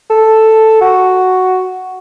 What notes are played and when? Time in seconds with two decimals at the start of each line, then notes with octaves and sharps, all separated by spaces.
0.10 A4
0.81 F#4